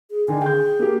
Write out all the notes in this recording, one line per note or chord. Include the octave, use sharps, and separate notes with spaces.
G#4
D3 D#3 D4 G#5
G#4 G5 G6
A#3 G4